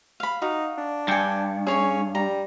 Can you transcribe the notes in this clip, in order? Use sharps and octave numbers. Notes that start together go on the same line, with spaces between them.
F5 B5
D#4 F#4 F5
D4
G2 G5 G#5
C#4 G#4 C#5 G#5
G3 A#5